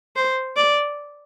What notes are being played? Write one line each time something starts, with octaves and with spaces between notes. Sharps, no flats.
C5
D5